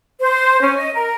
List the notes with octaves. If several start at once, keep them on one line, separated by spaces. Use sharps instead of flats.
C5
C#4
D#5
A#4